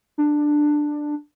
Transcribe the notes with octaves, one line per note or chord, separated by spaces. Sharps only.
D4